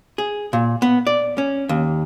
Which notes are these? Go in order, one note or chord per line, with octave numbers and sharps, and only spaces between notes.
G#4
A#2
B3
D5
C#4
D#2